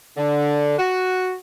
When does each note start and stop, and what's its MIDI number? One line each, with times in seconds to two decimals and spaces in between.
0.17 0.77 50
0.78 1.35 66